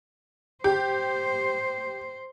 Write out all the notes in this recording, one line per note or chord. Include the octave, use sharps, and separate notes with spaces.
G4 C5